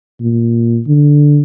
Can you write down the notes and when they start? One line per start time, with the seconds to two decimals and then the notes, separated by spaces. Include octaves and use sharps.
0.20 A#2
0.87 D3